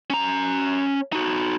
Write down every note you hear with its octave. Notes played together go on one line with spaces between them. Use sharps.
C#4 A#5
D#4 F#4